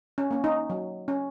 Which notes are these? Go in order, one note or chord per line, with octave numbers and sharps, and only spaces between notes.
C#4
A#3 C#4
D#4
F#3
C#4